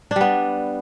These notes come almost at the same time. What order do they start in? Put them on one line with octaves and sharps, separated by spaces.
D4 G3 B3